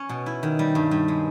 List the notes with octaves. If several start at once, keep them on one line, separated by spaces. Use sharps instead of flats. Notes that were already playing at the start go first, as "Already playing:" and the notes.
Already playing: C#4
B2
E4
D#3
G3
G2
G2
G#3